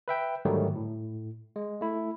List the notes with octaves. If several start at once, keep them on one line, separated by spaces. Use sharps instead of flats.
B4 E5 G5
G#2 D3 D#3 F#3 G3 A3
A2
G#3
A3 E4